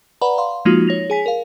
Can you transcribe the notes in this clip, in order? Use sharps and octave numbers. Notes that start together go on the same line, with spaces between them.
B4 D5 F#5 A#5 B5
F5 C6
F3 G#3 A#3 D#4 F4 F#4
C#5 A#6 F7
G#4 G#5 B6
A#4 F5